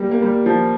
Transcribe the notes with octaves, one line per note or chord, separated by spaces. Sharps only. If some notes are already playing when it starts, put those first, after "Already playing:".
Already playing: G3 A#3
A#3
G3
F3